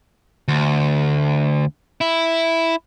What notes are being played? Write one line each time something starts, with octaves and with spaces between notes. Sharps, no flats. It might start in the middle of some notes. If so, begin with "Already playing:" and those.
D2
E4